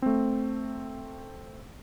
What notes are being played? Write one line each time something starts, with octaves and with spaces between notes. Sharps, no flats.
A3 C4